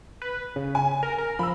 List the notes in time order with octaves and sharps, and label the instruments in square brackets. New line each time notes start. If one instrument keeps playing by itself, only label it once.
[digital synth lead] B4
C#3
[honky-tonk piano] G#5
[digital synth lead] A#4
A#4
[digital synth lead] F3 [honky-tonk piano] B5 E6